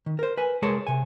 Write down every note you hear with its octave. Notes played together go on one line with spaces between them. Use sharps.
D#3
A#4 C5
B4 G#5
C2 G#3 G#4 A#4 C#5 A5
C3 G#5